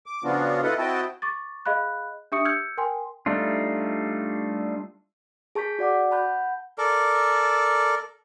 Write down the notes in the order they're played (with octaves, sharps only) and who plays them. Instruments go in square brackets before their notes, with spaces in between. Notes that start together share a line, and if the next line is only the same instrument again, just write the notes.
[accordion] D6
C#3 F3 B3 D4 F4 F#4
E4 F4 A4 B4 D#5 F#5
C4 E4 F#4 D#5 G5 A5
[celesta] C#6 D6 A6
G#4 D#5 F5 B5 F#6
D4 G4 E5 C#6 D#6 C#7
E6 F6 G6 G#6 C#7
A#4 G5 G#5 C6
[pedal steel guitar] G3 A3 D4 D#4 F4
[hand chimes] G#4 A5 C#6 G6 B6
F#4 D5 F#5 D6
F#5 A5 B5 F#6 G6
F#5
[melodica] A4 A#4 D5